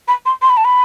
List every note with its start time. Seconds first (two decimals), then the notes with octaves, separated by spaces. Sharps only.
0.08 B5
0.26 C6
0.42 C6
0.50 B5
0.57 A5
0.65 B5